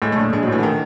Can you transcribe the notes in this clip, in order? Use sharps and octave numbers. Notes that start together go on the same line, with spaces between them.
A2 G#3
A3
A#1
A#1 G#3
F#3
A2 E3
D3
D#3